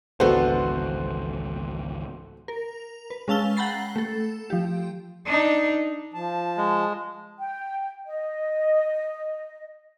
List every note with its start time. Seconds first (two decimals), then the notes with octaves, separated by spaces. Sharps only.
0.20 G#1 C#2 E3 B3 D4 F#4 A4 C5
2.48 A#4
3.10 B4
3.28 G#3 C#4 F5 A5 E6 G7
3.57 F#5 G5 A#5 B5 A6 C7
3.96 A3 A4
4.50 F3 G4
5.26 D4 D#4
6.14 F3 A5
6.57 G#3
7.39 G5
8.07 D#5